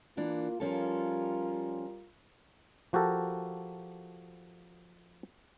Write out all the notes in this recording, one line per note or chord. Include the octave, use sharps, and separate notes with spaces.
E3 A#3 D4 F4
F3 G3 C#4 F4 A4 A#4
F3 F#4 G4 A4 A#4